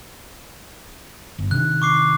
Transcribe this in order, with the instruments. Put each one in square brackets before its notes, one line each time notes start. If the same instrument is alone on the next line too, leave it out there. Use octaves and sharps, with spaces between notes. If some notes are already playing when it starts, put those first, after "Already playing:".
[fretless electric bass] G1
[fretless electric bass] C3 D#3 D4 [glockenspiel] F#6
[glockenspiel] C#6 D6 C7